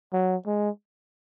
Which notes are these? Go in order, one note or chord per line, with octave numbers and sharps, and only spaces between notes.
F#3
G#3